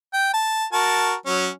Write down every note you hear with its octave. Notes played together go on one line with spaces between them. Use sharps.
G5
A5
F#4 A#4 A5
F#3 C#4